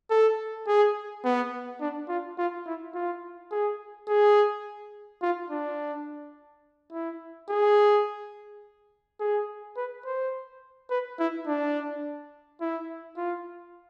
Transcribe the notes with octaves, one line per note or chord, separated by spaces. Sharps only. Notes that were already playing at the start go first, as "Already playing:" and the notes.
A4
G#4
B3
D4
F4
F4
E4
F4
G#4
G#4
F4
D4
E4
G#4
G#4
B4
C5
B4
E4
D4
E4
F4